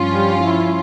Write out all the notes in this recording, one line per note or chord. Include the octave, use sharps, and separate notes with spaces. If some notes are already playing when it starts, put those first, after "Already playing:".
Already playing: G2 F3 C#4 F4
G3
E4